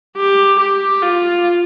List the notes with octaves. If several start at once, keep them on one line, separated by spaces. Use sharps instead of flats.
G4
G4
F4